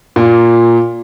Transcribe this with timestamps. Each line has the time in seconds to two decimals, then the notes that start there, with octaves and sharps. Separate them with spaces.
0.16 A#2